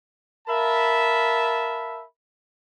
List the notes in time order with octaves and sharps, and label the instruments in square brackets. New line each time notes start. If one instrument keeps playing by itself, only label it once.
[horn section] A#4 E5 F5 A5 B5